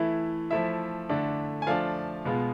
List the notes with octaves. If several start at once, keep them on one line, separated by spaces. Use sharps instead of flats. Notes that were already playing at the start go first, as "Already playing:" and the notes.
Already playing: E3 A3 E4
F3 A3 E4 E5
D3 A3 D4
G#5
F3 A3 D4 F4 F5
B2 G#3 B3 F4